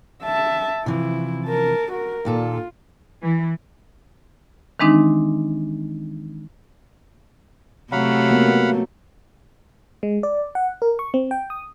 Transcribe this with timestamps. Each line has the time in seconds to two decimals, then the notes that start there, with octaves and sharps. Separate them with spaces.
0.24 E5 A5
0.86 C3 E3 F3 E4
1.45 A#4 A5
1.92 F#4 A#4
2.25 D#2 A#2 F4 A4
3.22 E3
4.80 D#3 E3 G#3 C4 D4 D#4
7.92 C3 F#3 A3 F5 F#5 B5
8.31 A#3 B3 F4
10.03 G#3
10.23 D5
10.55 F#5
10.82 A#4
10.99 C#6
11.14 C4
11.31 G5
11.50 D#6